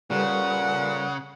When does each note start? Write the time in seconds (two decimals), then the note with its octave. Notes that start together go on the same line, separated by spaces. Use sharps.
0.11 A#2 C#3 G3 A4 B4 F#5